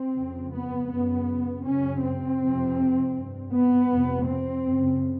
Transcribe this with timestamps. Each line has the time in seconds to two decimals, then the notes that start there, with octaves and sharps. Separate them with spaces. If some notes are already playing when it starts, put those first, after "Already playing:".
Already playing: C4
0.13 F2 C#3
0.51 B3
0.88 F#2 C#3 B3
1.64 F#2 C#3 C#4
2.01 C4
2.39 F2 C3
3.14 G2
3.52 B3
3.88 F2 C3
4.27 C4
4.64 F#2 C#3